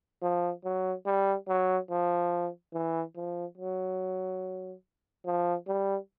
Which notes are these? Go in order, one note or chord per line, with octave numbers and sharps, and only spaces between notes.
F3
F#3
G3
F#3
F3
E3
F3
F#3
F3
G3